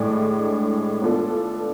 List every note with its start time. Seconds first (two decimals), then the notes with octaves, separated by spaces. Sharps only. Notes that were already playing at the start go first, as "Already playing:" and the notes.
Already playing: A2 G#3 D4
1.02 B3 D4 F4 A4